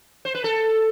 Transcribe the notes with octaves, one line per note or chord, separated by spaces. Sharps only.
C5
B4
A4